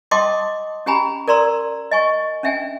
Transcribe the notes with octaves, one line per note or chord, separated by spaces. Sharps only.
D#5 G5 A5 C6 D6 D#6
C#4 G4 G5 G#5 A#5 B5
A#4 D5 A#5 C6 E6
D#5 G#5 C#6
C#4 D4 E5 G5 G#5